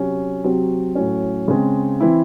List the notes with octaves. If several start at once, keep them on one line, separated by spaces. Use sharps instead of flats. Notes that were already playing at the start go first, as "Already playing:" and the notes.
Already playing: C3 F#3 C#4 F#4
C3 F#3 C4 F#4
A2 F#3 C#4
C#3 G#3 C4
E3 C4 E4